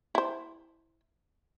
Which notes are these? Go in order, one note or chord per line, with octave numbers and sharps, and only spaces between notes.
E4 C5